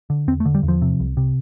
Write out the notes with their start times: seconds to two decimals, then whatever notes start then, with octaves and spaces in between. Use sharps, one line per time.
0.10 D3
0.28 E2 C4
0.40 A3
0.45 D3
0.55 G3
0.63 E2
0.68 F3
0.82 C3
1.00 C2
1.17 C3